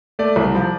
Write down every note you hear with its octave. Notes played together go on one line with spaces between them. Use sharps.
A3 D5
C2
F3